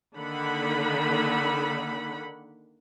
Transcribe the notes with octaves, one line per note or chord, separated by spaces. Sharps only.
D3 D#3 A#3 F#5 B5